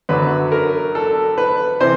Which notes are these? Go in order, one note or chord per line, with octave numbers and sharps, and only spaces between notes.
F#2 D3 F#3 B4
A#4
A4
B4
C3 E3 C5